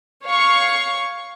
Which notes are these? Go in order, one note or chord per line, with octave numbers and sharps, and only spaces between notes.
C#5 F5 C#6